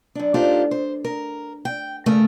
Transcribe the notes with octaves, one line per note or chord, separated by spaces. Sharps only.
F#2 D4
D4 D#4 F4 G4 A4 C5
C5
A#4
G5
D2 G2 C#3 A3 A#4